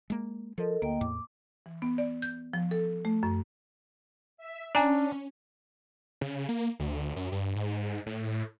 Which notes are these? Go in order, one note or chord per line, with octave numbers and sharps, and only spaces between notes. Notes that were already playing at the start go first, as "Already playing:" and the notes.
G#3 A#3
F3 A4 A#4 D#5
D2 A#3 D#5 G5
E2 A2 D6
E3
B3
D5
G6
F3
A4
A3
F#2
E5
C#4 D4 G#5 A#5
C#3
A#3
D2
F#2
G2
G#2
A2